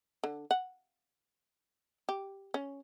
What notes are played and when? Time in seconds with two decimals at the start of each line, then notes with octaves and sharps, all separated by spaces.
0.24 D3
0.51 F#5
2.09 G4
2.54 C#4